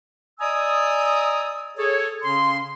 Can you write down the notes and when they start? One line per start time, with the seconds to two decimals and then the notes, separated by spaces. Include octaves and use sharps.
0.40 D5 D#5 G#5 A#5 D#6 E6
1.77 G#4 A4 C#5
2.24 C#3 C#4 C6